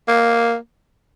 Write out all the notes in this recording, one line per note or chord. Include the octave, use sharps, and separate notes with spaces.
A#3